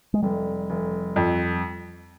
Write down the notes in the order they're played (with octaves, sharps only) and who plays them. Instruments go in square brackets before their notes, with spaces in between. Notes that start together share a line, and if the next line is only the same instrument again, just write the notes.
[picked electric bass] G#3
[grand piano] F1 [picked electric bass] G3
[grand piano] F1
F2